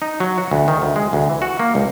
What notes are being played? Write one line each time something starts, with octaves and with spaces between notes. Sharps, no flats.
D#4
F#3
F#4
D2
D#3
D2
G#3
D2
E3
F#4
A#3
C#2